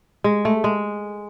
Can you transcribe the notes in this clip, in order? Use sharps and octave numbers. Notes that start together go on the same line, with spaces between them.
G#3
A3
G#3